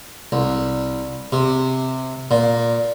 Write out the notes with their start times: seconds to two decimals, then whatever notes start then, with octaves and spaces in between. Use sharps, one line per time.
0.32 C2
1.32 C3
2.31 A#2